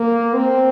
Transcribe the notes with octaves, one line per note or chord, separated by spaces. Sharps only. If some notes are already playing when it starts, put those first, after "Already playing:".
Already playing: A#3
C4